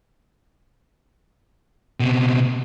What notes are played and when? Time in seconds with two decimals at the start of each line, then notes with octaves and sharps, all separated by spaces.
2.00 B2 C4